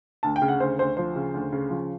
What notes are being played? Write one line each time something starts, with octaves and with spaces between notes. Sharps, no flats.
D2 A5
G5
C#3
F#5
D2 C5
D2 C5
F3 C5
C#3
D2
C#3
F3